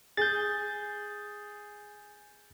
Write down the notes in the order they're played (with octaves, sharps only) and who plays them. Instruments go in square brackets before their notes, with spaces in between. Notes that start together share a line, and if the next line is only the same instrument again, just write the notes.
[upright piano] G#4 [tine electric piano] G6 A6